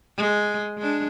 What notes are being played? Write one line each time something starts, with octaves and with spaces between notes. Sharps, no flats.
G#3
G#3 D4